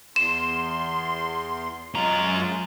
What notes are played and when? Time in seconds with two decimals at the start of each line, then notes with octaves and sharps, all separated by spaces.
0.16 E2 C6 E7
1.94 F#2 G#3 F4 A#5